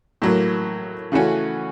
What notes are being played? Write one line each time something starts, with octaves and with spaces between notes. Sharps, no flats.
A2 F#3 A#3
C#3 E3 A3 C#4 F#4